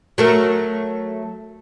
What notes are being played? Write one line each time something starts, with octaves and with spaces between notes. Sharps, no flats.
F#3 A3 A#4